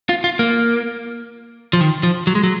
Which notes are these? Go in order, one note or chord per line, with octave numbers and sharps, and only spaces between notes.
F4
F4
A#3
F3
D#3
F3
F#3
G#3
F#3